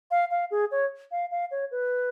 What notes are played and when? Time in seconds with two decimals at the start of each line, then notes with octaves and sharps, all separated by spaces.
0.11 F5
0.31 F5
0.51 G#4
0.71 C#5
1.12 F5
1.31 F5
1.51 C#5
1.71 B4